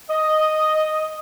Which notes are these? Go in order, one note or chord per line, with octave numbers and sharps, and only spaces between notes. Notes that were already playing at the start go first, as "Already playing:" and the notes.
D#5